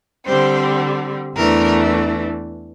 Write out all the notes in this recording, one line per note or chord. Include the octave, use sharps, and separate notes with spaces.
D3 G3 C4 C5
E2 E3 A3 D4 A#4